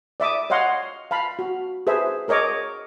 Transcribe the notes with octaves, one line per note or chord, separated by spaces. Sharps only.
D5 E5 D6 D#6
C#5 D#5 F5 F#5 C6
F5 A5 B5
F#4
G#4 B4 C5 E5
G#4 A#4 C#5 D#5 D6